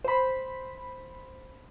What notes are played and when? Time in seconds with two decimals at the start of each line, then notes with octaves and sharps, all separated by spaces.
0.05 C5 B5